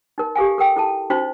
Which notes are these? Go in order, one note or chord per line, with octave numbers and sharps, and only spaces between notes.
D#4 A#4
G4 A4 F5 G#5
A4 A#4 G5
E4 A4 A5
C#4 D#4 F#4 C5 B5 C6